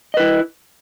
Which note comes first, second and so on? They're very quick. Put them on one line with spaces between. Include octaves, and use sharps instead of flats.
D#5 B4 E4